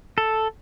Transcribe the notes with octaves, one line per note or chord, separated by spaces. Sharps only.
A4